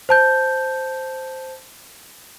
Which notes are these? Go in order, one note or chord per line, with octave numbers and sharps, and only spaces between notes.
C5 A5 G6